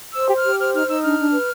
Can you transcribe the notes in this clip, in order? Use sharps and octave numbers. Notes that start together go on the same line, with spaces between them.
C5 E6
G4
F6
G4
C5 F6
D#4 F6
D#4 E6
D4 F6
D4
B4